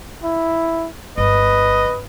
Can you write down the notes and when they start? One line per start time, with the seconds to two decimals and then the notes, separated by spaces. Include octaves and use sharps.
0.24 E4
1.18 G1 B4 D#5